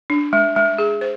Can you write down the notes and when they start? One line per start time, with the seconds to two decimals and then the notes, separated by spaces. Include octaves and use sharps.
0.10 D4
0.33 G#3
0.56 G#3
0.78 G#4
1.01 C5